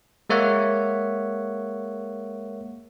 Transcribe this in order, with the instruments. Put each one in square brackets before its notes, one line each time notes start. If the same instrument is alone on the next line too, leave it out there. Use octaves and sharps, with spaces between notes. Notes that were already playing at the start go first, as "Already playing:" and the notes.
[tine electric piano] G#3 A#3 C#5 E5 F#5